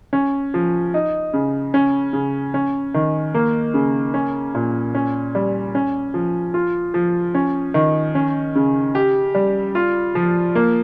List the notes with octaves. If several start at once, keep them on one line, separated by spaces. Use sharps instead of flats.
C#4
F3
D#4
C#3
C#4
C#3
C#4
D#3
A#3
C#3
C#4
A#2
C#4
G3
C#4
F3
F4
F3
C#4
D#3
C#4
C#3
G4
G3
F4
F3
A#3